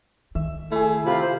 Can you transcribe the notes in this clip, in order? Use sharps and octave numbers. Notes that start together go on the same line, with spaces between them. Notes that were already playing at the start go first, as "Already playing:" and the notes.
D#3 E5
A3 E4 G#4
C3 F4 F5 B5
C5